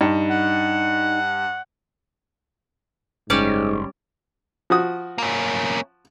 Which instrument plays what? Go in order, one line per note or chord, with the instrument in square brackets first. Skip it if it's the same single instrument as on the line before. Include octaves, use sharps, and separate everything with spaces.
[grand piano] G2 [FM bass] D#4
[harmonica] F#5
[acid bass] F#1 [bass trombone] G#2 [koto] G3 C#4 D5
[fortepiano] F3 F#4 D#6
[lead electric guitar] A#3 C#4